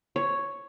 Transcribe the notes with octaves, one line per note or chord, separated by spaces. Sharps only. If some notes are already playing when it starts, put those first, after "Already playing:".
C#5